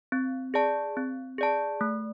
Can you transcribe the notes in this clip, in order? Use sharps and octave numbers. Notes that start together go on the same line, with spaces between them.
C4
G#4 D5 A5
C4
G#4 D5 A5
A3